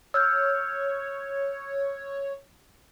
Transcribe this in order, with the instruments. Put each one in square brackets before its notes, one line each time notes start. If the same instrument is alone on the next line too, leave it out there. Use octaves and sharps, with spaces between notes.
[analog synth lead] C#5 [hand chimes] E6 F6 G6